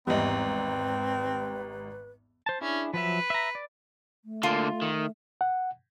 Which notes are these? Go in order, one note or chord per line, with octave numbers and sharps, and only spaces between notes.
G#1 E2 G3 C4 B4 D#5
C5 A5
C#4 D4 E4 G#4
F3 F#3 B4 E5
E5 A#5
D5
A3
D3 A#3 F4
D#3
F#5